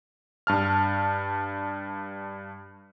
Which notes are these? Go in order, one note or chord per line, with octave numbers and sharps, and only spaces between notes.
G2 A5 F6